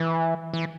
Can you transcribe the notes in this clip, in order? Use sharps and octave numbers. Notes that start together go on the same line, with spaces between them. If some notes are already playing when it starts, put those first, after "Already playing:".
Already playing: E3
E3